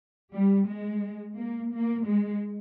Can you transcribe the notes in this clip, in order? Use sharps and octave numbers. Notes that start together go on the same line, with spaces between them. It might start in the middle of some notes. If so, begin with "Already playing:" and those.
G3
G#3
A#3
A#3
G#3